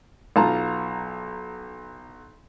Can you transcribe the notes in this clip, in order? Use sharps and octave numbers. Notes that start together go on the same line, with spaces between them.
B1 F4 A5 A#5